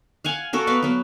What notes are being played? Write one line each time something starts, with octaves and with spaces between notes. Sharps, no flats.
F5 F#5 G#5
A#3 F#4 A4 A#4
B3 A#4 B4 F5
F#3 B3